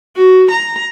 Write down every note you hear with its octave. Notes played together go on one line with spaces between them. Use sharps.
F#4
A#5